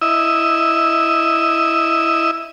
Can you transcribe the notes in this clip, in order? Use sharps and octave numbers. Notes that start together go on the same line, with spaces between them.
E4 D#5 E6